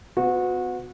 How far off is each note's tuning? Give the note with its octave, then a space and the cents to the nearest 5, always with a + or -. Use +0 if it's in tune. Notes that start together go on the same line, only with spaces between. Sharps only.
B3 +40 F#4 -25